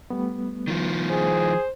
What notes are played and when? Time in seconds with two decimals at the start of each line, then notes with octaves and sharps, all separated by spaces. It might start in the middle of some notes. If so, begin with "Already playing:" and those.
0.10 G3 A3 B3
0.68 D#3 F3
1.10 G#4 C5